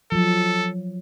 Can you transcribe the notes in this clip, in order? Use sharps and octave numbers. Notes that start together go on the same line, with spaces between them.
F3 F#3 A4